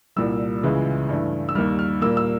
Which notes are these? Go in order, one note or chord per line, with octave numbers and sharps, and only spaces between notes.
C2 A#2 G3 E6
C#2 C#3 E3 G#3
G2 E3 A3
E6
D#2 D#3 G3 F6
F6
A#2 G3 A#3 E6
E6